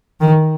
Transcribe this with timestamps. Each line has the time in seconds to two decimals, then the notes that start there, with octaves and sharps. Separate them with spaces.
0.21 D#3